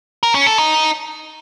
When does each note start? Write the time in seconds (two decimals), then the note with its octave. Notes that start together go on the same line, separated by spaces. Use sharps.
0.23 A#4
0.35 C#4
0.47 A4
0.58 D#4